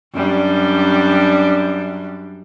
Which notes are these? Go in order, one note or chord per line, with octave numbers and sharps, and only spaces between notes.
F#2 G3 D4